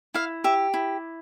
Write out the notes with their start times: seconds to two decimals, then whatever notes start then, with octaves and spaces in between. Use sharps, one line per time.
0.14 E4 F5
0.44 G4 E5
0.74 E4